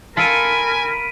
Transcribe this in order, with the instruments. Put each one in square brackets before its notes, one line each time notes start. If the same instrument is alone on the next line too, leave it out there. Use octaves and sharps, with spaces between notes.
[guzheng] F4 A4 [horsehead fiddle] A#4 B5 [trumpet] G#5 [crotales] B6 D7 D#7